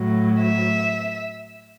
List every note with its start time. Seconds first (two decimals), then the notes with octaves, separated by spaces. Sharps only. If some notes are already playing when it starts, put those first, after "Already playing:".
Already playing: A2 F#3
0.40 E5